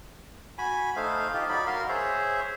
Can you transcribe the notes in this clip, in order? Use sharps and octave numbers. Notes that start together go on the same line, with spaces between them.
F#4 G#5 B5
A3 D#4 C5 F5
D#4 F4 G4
F#3 D#4 D5 B5
F#4 A#4 F5 C6
G#4 C5 C#5 E5